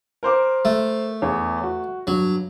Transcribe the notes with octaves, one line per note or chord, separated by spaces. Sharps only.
A#4 C5 D6
A3
E2 C#5
F#4
G2 F#3